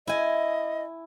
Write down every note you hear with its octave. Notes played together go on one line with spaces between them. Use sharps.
E4 D#5 G#5